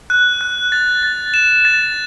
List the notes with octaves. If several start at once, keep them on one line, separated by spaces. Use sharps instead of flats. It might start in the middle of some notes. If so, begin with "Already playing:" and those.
F#6
F#6
A6
A6
E7
A6